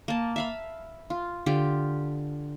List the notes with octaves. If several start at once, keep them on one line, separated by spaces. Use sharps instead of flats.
A#3 A5
E5 F5 B5
F4
D3 F4 G4